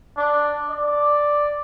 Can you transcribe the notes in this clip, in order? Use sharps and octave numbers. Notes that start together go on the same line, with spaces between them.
D4
D5